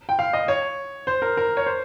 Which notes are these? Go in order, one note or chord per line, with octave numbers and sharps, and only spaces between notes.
G5
F5
D#5
C#5
C5
A#4
A#4
C#5
C5